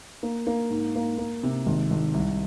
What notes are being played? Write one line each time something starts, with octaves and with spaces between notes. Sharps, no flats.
A#3
A#3
G#2
A#3
A#3
C3
G#1
G#1
C2